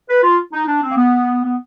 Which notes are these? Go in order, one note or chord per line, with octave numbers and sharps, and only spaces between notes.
B4
F4
D#4
D4
C4
A#3
B3
B3